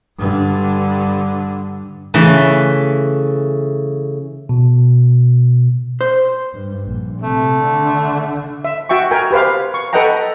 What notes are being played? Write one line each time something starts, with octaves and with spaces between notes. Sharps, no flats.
G2 D3
C#3 E3 A3
B2
C5
G2
A#1
C3 A3
D3
E5
F#4 E5 G5 C#6
A#4 G5 G#5
G4 B4 C5 F5
C#6
A4 B4 D#5 F#5 G5 A#5